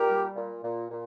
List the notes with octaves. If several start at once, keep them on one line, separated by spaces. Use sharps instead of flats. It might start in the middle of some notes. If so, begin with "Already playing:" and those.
Already playing: A#2 G4 A#4
G3
A#2
A#2
A#2